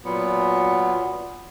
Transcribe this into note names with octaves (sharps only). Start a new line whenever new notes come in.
A#2 F#3 B3